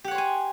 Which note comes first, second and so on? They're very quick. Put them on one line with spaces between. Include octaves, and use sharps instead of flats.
G4 F#5 C#5 C5 G#5